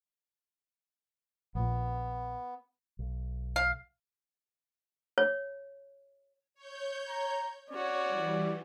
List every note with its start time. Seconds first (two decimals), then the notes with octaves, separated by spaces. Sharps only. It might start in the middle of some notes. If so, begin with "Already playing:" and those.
1.55 A#1 A#2 B3
2.99 B1
3.56 F5
5.18 C#5
6.54 C#5 G6
7.09 A#5
7.70 C#4 F#4 C#5 D5
8.07 E3 G3